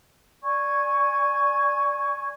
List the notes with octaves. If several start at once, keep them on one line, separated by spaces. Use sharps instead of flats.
D5 G#5 C#6 G#6